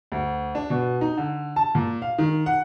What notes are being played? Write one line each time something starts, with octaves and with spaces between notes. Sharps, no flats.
D2
D4
B2
D#4
D3
A5
A#2
F5
D#3
F#5